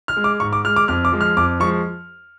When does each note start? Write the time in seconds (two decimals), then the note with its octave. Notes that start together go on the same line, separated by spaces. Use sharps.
0.08 F6
0.17 G#3
0.24 D6
0.40 G#2 C#6
0.53 D6
0.65 G#3 F6
0.76 D6
0.88 F2 F6
1.05 D6
1.12 F3 G#3
1.21 F6
1.37 F2 D6
1.60 F3 G#3 C#6